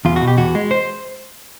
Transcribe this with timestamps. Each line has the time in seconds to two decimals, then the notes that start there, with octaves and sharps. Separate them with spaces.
0.05 E2 F4
0.16 F#4
0.21 B2
0.28 G4
0.37 E2 F#4
0.55 G#3
0.71 C5